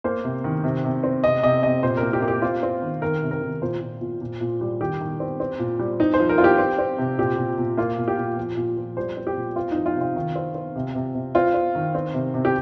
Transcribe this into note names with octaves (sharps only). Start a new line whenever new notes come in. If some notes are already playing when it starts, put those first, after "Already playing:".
A#3 C5
C3
D#3
C3
C3
C4
C3 D#5
C3 D#5
C3 D#5
A#2 C5
A#4
A#3
G4
A#3
G4
C4 F4
C4
D#3
D#3 A#4
C3
A#4
D#3
A#2 C5
A#2
A#2
A#2
A#2
G3
D#3 G4
D#3
C4
C4
A#2
G3
C4 D#4
C5
F3
A#4
C4 F4
G4
C4
C4
C3
A#2 G4
A#2
A#2
A#3 F4
A#2
G4
A#2
F3
A#2
F3
G3 C5
C4
G4
A#2
C4 F4
F3 D#4
F4
C3 F4
D#3
C4
C4
C3
C3
C3
C4 F4
C4
D#3
C4
C3
C3
G4